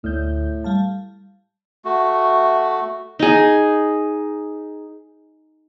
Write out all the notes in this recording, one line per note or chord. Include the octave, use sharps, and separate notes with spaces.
D2 A2 G6
G3 F5 A5
A3 F#4
D#4 G#4